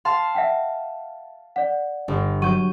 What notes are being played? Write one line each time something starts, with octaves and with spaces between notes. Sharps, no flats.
F5 A5 C6
E5 F#5 G5
D5 F#5
G1
F#3 C#6 G6 D#7